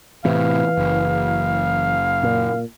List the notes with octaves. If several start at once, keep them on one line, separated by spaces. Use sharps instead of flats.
A2 C3 E3 F5
F#1
A#2